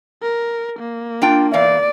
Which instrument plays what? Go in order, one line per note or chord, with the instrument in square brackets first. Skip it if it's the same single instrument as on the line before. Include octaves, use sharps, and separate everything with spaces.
[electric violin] A#4
A#3
[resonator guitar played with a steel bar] D4 F4 G5
[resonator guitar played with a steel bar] E2 E3 F5 [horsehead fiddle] D5